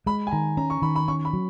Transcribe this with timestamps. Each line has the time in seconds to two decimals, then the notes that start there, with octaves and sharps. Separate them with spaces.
0.06 G#3 B5
0.27 G#5
0.31 D#3 A#5
0.57 C#4 A#5
0.70 C#6
0.82 D#3 B5
0.96 B5
1.08 C#4 C#6
1.25 B5
1.33 F#3